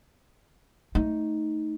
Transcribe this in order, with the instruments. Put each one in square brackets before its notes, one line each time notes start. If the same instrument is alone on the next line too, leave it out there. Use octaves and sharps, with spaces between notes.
[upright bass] A3 D#4